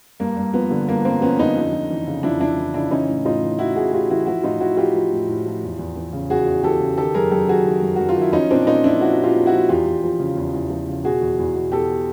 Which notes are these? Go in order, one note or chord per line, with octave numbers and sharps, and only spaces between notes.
G2 A#3
G2
F3 B3
D3
G2 A#3
G2 A#3 C4
F3 B3 C#4
D3 C#4 D#4
F2
F2
E3
C#3
F2 D4 E4
F2 D4 E4
E3
C#3 D4 E4
E3 C#4 D#4
A2
A2 D#4 F4
E3
E3 E4 F#4
A2 F#4 G#4
A2 F4 G4
E3 E4 F#4
F3 E4 F#4
A2 D#4 F4
A2 E4 F#4
F3 F4 G4
F3
A2
A2
F3
E2
E2
E3
C#3
E2 F#4 G#4
E2
E3 G4 A4
C#3
D#3 G4 A4
F#2 G#4 A#4
F#2 G4 A4
D#3 F#4 G#4
D#3
F#2
F#2 F#4
F4
D#3 E4
F3 C#4 D#4
A#2 C4 D4
A#2 C#4 D#4
F3 D4 E4
F3 E4 F#4
A#2
F4 G4
A#2
E4 F#4
F3
E2 F4 G4
E2
F3
C#3
E2
E2
F3
C#3
B2 F#4 G#4
E2
E2
B2
B2 G4 A4